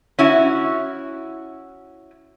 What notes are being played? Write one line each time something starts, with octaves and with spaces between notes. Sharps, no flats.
C#4 E4 F#4